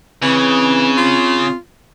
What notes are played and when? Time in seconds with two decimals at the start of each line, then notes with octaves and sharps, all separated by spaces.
0.23 C#3 E3 C4
0.98 F4